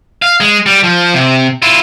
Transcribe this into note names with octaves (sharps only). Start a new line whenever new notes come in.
F5
G#3
G3
F3
C3
E4 F4